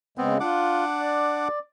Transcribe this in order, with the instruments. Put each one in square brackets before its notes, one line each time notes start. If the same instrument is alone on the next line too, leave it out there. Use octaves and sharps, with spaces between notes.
[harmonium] C#3 G#3 [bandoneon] B3 C4
[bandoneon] D4 F#5 D6 [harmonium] F4
[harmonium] D5